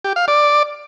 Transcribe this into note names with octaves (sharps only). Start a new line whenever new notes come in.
G4
F5
D5